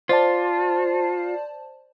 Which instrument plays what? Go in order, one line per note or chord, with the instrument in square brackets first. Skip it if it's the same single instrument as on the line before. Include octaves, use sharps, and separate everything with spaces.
[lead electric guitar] F4 [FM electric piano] C5 D5 A5